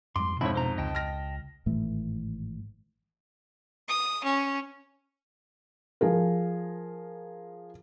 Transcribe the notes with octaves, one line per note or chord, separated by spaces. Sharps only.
F2 G#2 G3 C6 D6
F2 G#2 B2 D4 E4 C#5
C5 A#5
C#2 D#5 G5 A5
F6 A#6
G#1 A2 E3 A3
D#6
C#4
F3 G#4 A#4